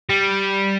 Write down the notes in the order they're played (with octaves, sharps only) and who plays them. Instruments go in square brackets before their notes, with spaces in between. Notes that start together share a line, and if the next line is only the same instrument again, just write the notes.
[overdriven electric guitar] G3